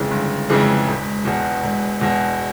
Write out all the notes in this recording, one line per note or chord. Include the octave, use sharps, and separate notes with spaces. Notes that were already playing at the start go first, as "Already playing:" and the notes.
Already playing: G1 F2 C#3 E3 G#3
G1
F2 C#3 E3 G#3
E1
E2 B2
E1
E2 B2